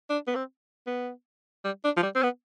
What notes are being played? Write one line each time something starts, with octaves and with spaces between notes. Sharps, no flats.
D4
B3
C4
B3
G3
D4
F3
G3
C4
B3